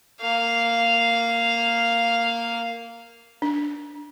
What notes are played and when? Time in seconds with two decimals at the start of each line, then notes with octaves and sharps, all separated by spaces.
0.21 A#3 F5
3.42 D4